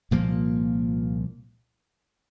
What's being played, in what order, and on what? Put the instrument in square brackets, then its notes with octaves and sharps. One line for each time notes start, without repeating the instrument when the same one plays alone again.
[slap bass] C2 A#2 F3 A#3